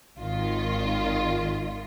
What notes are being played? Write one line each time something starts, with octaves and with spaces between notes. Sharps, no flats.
G#1 D#3 F4